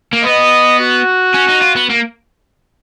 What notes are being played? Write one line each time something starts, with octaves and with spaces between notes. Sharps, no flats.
A#3
B3 B4 D#5
F#4
C#4
D#4
F4
B3
A#3